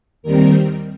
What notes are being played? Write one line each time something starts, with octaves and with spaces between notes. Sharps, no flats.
D#2 D#3 G3 C4 A#4